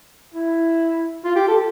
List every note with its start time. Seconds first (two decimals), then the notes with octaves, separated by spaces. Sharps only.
0.34 E4
1.25 F4
1.36 G4
1.48 A4